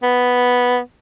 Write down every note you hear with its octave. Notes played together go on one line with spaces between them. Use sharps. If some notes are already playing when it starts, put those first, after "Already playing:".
B3